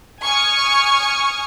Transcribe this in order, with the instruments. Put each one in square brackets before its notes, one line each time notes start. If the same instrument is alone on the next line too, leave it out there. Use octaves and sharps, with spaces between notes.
[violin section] G#5 C#6 D#6 F6